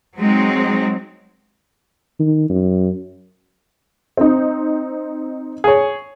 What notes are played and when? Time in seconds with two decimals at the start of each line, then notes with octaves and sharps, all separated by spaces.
0.18 F#3 G#3 C4 D#4
2.20 D#3
2.50 F#2
4.17 C4 D#4
5.64 G#4 C#5